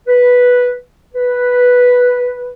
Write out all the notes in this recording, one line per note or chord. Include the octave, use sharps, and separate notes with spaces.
B4
B4